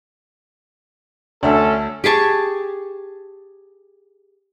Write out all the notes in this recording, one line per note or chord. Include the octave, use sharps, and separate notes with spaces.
D2 C#4 D4 A4 E5
G4 G#4 A5 C#6